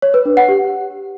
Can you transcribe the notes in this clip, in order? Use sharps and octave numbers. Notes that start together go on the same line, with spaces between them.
C#5
B4
D4
F#5
G4